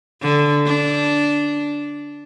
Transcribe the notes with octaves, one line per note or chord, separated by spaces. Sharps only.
D3
D4